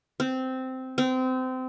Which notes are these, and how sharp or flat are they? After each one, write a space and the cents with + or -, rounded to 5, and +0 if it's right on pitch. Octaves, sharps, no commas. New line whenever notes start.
C4 -10
C4 -25